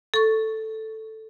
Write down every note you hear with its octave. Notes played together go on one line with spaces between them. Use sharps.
A4 C#6